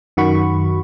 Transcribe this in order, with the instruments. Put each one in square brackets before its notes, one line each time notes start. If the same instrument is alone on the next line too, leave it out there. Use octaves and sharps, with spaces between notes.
[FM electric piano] F#2 D#3 F#4 B5 C#6